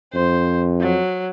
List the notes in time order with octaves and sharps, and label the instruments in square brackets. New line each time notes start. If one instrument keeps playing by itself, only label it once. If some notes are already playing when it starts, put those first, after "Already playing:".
[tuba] F2 [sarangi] C5
[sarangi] F#3